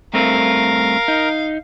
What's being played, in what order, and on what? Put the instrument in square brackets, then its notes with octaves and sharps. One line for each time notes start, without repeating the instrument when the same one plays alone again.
[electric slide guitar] G2 A3 C4 [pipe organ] A#4 [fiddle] F5
[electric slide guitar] D#4